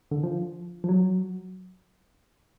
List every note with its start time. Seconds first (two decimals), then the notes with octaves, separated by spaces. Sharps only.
0.11 D3
0.23 F3
0.84 F3
0.89 F#3